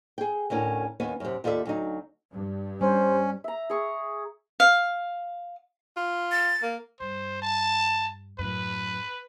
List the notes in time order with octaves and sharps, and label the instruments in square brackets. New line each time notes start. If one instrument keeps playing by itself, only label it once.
[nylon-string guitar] G#4 G5
D2 A2 C#4 A#4
D#2 B3 C#4
F#2 C3
D#2 F4 A4 D5 E5
D2 F#3 D#4
[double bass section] G2
[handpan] G3 [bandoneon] C#4 [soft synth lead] C5
[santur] E5 A#5
G#4 C#6
[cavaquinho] F5
[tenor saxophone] F4
[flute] A6
[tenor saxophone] A#3
[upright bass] G2 [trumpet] C5
[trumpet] A5
[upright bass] F#2 A2 [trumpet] B4